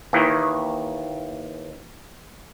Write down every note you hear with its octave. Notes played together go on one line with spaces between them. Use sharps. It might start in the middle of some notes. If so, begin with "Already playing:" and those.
D#2 D#3 E3